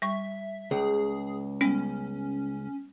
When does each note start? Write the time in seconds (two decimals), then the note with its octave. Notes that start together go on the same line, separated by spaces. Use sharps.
0.02 G3 E5 C#6
0.71 C#2 G#4
1.61 G3 G#3 B3 C#4